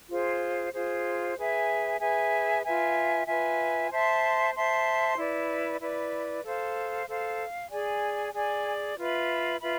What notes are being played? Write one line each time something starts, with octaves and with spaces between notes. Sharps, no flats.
F4 G#4 C5
F4 G#4 C5
G#4 B4 E5 G#5
G#4 B4 E5 G#5
F4 B4 E5 G#5
F4 B4 E5 G#5
C5 E5 A5 C6
C5 E5 A5 C6
E4 B4 D5
E4 B4 D5
A4 C5 F5
A4 C5 F5
G#4 D5 G#5
G#4 D5 G#5
F4 B4 E5 B5
F4 B4 E5 B5